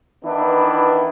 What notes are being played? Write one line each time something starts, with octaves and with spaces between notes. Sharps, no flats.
D#3 E3 B3 D4 E4